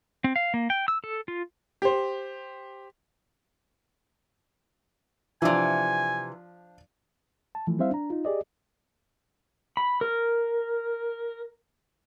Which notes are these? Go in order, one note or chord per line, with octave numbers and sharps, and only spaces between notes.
C4
F5
A#3
G5
E6
A4
F4
G4 C5
C3 E3 F3 D4 G#5
A5
E3 F3 A3
G3 C4 E4 C5 E5 F5
D4 A#5
D#4 F4
G4 G#4 D5 D#5
B5
A#4